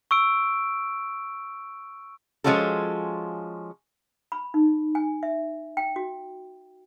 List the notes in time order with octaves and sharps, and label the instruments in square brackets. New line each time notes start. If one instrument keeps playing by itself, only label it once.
[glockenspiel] C#6 E6 D7
[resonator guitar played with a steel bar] F3 G#3 C#4 F4 F#4 A4
[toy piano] B5
D#4
G#5
E5
G5
F#4